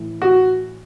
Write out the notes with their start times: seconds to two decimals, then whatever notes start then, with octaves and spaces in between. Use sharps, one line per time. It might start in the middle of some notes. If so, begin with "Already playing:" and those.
Already playing: A2 E3
0.22 F#4